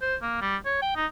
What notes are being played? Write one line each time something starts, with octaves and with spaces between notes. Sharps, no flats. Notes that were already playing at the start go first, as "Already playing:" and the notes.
C5
A#3
G3
C#5
G5
D#4